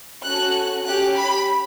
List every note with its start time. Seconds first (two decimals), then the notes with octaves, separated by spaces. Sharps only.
0.24 C#4 F#4 A4 F#6
0.84 C#4 G4 F#6
1.15 B5